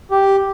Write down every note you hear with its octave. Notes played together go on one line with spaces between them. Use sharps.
G4